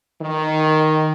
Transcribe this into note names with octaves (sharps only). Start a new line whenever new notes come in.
D#3